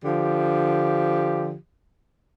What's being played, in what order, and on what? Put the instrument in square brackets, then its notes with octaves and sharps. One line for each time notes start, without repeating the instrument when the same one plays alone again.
[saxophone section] D3 F3 G4